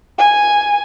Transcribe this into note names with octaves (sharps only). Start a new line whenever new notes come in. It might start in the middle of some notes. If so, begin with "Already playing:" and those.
G#5